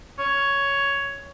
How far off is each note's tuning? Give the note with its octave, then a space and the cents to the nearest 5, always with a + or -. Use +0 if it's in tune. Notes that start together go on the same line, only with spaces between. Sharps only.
C#5 +10